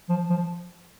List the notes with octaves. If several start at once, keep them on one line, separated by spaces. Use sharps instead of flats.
F3
F3